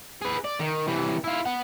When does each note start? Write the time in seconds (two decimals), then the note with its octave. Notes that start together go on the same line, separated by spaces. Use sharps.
0.21 G#4 B4
0.44 D5
0.59 D#3
0.88 C3 E3
1.24 E4 F4
1.45 B3 F#5